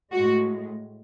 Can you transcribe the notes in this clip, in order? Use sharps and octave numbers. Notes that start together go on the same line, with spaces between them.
A2 G#3 F#4